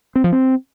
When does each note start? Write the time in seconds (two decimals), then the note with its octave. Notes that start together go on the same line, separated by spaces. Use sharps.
0.15 C4
0.24 F3
0.33 C4